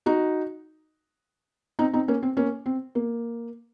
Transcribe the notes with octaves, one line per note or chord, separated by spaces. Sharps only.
D#4 F#4
C4 D#4
C4 D#4
A#3 C#4
C4
A#3 C#4
C4
A#3